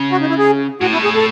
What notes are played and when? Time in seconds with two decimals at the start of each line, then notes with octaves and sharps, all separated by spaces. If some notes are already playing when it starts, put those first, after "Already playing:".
Already playing: C#3
0.12 F#4
0.21 D#4
0.30 E4
0.38 G#4
0.81 A2 F#4
0.93 B2 E4
0.98 A2
1.04 G#4
1.15 A4